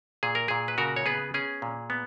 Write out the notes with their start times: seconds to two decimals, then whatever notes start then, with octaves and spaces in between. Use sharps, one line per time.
0.23 A#2 G#4
0.35 A#4
0.48 A#2 G#4
0.68 B4
0.78 C#3 F#4 A#4
0.96 C#5
1.06 B3 G#4 B4
1.34 C#4 G#4
1.62 A#2
1.90 B3